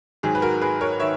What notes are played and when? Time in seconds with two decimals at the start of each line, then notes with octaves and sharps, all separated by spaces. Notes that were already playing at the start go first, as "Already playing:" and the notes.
0.23 G#2 D#3 F#3 G#4
0.35 B4
0.42 F#4 A#4
0.62 G#4 B4
0.81 A#4 C#5
1.00 D#3 C#5 E5